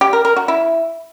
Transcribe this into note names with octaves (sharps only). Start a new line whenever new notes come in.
G4
A#4
A#4
F#4
E4